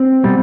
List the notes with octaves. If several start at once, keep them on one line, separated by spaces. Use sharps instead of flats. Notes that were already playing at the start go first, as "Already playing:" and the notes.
Already playing: C4
B2 G3